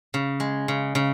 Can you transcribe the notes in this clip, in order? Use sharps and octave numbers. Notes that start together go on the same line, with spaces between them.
C#3
G#3
C#3
C#3